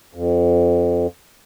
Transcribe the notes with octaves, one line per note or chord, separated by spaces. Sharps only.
F2